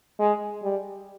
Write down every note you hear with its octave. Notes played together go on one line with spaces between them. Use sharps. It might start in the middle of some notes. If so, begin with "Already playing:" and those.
G#3
G3